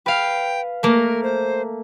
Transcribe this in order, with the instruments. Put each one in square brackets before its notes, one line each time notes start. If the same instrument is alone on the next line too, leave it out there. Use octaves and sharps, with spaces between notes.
[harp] B4 F5 [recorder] G5
[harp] A3 A#3 [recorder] A#4
[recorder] C5